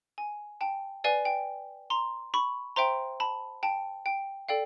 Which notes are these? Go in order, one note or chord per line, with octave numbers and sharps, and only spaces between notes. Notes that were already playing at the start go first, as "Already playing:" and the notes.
G#5
G5 A5
B4 D5 F5 G#5
G5
A#5 C6
B5 C#6
C5 E5 G5 A#5 C6
A5 B5
G5 A5
G5
A4 D5 F5 G5